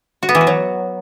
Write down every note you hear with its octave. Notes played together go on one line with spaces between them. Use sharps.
F#4
B3
E3
F#4
F#3